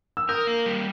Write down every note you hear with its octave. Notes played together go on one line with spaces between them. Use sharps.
E6
A#4 D#6 G6
A#3
G3